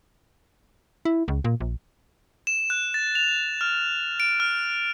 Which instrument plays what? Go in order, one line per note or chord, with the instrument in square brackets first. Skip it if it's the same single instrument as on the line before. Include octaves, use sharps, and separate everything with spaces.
[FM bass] E4
C#2
A#2
A#1
[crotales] E7
F#6
A6
F7
F6
D7
F6